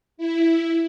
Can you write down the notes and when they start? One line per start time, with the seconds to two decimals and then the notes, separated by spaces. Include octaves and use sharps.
0.17 E4